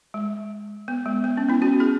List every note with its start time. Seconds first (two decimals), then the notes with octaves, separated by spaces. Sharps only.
0.14 G#3
0.88 B3
1.06 G#3
1.24 B3
1.37 C#4
1.49 B3 E4
1.62 C#4 F#4
1.80 E4 G#4